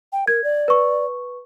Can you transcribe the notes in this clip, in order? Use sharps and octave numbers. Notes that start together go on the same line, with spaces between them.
G5
A#4 G#6
D5
B4 C#6